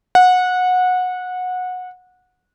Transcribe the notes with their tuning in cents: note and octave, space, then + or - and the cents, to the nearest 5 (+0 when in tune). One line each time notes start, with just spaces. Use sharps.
F#5 -20